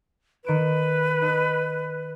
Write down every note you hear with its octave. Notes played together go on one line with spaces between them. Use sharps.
D#3 B4 D7 E7
D#4